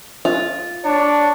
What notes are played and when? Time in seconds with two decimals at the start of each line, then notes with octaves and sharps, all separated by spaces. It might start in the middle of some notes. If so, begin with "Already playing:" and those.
0.25 F4
0.85 D4 C#5